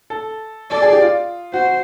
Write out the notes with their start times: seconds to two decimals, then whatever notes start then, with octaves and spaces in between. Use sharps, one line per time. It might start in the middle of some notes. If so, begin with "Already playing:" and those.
0.10 A4
0.71 A4 D5
0.82 G#4
0.92 G4
1.02 F4
1.54 F#4 C5